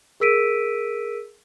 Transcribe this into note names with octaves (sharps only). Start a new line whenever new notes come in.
G#4 A#4 E6 B6 D7 D#7